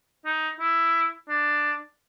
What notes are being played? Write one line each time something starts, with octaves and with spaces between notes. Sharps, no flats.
D#4
E4
D4